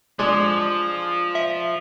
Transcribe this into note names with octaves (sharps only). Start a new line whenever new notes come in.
F3 G#3 D4
E5